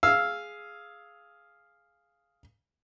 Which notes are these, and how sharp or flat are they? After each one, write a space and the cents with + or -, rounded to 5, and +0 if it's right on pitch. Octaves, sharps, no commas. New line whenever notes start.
G#4 +5 F5 +0 E6 +0